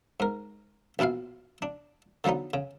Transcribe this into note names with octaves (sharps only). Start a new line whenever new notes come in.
G#2 A#4
A#1 B2 E4 F4 F5
D4
D3 F3 F#3 B3 D#4
C#3